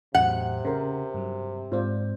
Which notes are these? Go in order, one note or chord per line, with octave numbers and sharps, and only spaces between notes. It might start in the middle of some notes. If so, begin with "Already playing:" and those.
E2 A2 C3 F#3 F#5
C#3 A#4 C5
G2 F#3
G#2 C4 F4 C5 D5